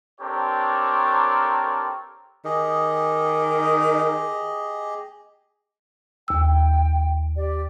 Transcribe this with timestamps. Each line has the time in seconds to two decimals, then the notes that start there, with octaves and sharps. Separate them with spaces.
0.21 C4 D4 G4 A4 A#4 C#5
2.45 D#3 G4 G#4 D#5
6.28 D#2 G5 E6
7.36 G4 D5